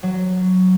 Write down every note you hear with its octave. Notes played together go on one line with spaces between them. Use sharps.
F#3